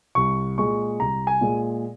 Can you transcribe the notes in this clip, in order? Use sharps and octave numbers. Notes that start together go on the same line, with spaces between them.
C2 C#6
A#2 G#3 C#6
C2 A#5
G#5
A#2 G#3